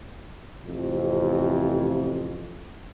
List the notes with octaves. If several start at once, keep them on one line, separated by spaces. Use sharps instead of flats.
A1 F2 C3